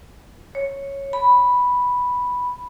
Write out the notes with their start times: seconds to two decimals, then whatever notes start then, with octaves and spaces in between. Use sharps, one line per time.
0.55 C#5
1.13 B5